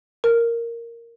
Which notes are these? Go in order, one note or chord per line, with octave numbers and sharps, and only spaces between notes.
A#4